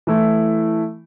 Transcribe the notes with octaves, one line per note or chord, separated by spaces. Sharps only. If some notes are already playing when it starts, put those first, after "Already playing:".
E3 A3 E4